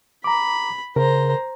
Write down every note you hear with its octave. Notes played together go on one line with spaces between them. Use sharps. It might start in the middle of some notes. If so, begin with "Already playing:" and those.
A#5 B5 D6
C#3 A#4 C5 A#5